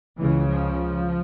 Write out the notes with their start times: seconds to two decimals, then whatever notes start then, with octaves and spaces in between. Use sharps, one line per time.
0.18 C#2 C#3 E3
0.48 F3